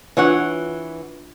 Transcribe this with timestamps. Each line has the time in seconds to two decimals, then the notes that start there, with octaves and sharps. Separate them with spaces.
0.17 E3 D4 F4 B4 C#5 F#5